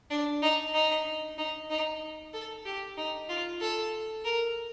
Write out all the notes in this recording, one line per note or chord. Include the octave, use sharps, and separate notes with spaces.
D4
D#4
D#4
D#4
D#4
A4
G4
D#4
F4
A4
A#4